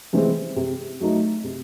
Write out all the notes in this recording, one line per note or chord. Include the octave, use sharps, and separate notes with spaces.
C3 E3 G#3 C4
C3
F#3 A3 D#4
C3